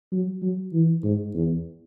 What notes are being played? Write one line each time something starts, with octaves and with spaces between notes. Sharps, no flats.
F#3
F#3
E3
G#2
E2